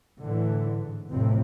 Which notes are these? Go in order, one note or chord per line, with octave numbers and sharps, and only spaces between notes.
A2 D3 E3
G#2
A1 F2 A2 C3 C4